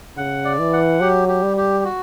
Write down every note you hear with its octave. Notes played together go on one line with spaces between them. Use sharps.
C#3 F#5
D5
E3
F#5
F#3 G4
G4
G3
G4
F#4